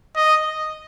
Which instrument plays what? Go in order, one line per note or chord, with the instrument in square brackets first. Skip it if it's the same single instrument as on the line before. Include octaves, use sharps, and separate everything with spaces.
[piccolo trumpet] D#5